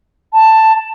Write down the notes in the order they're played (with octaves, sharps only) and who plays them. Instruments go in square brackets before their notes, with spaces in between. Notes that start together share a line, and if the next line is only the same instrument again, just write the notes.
[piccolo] A5